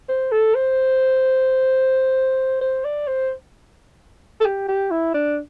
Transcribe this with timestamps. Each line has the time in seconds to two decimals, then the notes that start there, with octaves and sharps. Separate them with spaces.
0.08 C5
0.31 A4
0.54 C5
2.61 C5
2.84 D5
3.07 C5
4.40 A4
4.45 G4
4.68 G4
4.91 E4
5.14 D4